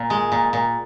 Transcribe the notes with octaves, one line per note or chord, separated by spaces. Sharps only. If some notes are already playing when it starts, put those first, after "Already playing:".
Already playing: A#2
G#3
A#2
A#2